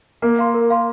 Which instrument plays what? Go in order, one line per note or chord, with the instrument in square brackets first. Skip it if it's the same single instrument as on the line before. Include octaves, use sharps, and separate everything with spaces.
[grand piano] A#3 [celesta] A#4
[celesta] F5 C6
A#4
F5 C6